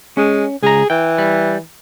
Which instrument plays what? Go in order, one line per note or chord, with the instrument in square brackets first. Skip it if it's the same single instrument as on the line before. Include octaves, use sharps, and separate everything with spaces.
[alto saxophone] G#3 [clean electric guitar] C#4
[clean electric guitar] C#2 A#5 [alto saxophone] G#4
[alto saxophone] E3 [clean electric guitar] G5
[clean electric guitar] G3